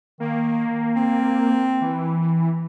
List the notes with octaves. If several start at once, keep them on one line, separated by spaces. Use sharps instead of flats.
D#3 A#3
C4
E3